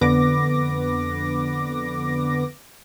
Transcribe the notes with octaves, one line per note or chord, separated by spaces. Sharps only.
F2 D3 B3 B4 D6 A#6